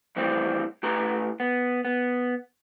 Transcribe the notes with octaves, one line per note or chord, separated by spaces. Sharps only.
F2 A2 E3 G3 C4
A2 G4 B4 A#5
B3
B3